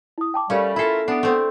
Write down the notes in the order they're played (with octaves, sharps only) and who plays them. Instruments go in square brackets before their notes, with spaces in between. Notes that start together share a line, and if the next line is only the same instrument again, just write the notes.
[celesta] E4 D#6
G5 A5 D6
[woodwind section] G3 [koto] A3 C#4 [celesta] G4 A#4 F5
[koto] E4 A4 [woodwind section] F4 A#4 E5 [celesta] B5 C7
[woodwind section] B3 [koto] D4 [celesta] C7 D7
[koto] A3 C4